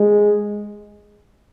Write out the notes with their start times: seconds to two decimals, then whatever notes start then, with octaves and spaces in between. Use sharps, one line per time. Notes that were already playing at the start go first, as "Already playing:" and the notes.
Already playing: G#3